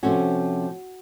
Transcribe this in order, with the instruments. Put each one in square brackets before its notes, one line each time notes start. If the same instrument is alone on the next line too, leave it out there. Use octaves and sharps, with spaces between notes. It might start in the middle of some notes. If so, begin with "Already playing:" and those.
[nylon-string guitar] C3 F3 A3 C#4 F#4